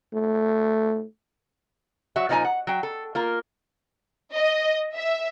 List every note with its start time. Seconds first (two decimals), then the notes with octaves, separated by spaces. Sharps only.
0.13 A3
2.16 F#3 F#4 E5
2.29 A#2 F3 D#4 E4 G#5 A#5
2.45 F#5
2.67 F#3 G5
2.83 A4
3.15 A#3 F4 A#4
4.33 D#5
4.95 E5